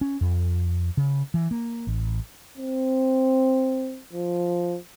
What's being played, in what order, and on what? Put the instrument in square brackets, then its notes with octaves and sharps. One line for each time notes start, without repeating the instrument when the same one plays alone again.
[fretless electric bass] C#4
F2
C#3
E3
A#3
A1
[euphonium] C4
F3